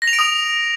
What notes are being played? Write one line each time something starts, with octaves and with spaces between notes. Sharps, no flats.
A#6
F7
D7
D#6